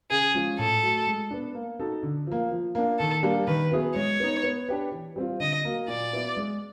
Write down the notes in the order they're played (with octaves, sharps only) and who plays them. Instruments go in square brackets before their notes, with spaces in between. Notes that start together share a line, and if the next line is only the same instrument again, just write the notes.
[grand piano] C#3 [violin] G#4
[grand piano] F3 G#3 C#4 F4
[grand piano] A2 [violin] A4
[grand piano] F#3 A3
G#3
B3 D4
A#3
D#4 F#4 A4
D3
F3 A#3
F3
A#3 D4
[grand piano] D#3 [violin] A4
[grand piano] G3 A#3 D4
[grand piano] D#3 [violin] B4
[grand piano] F#3 B3 E4 G#4
[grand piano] G#3 [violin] C#5
[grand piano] B3 D#4
B3
D4 G4 B4
E3
G3 C4 F4
[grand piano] D3 [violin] D#5
[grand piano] F#3 A#3
[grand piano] A#2 [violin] D5
[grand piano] F#3 B3 E4
G#3